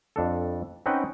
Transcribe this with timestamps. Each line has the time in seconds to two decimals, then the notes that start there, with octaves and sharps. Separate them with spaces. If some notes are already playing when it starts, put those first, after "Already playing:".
0.16 F2 D4 A4
0.86 C4 C#4 D#4 B4 F#5 G5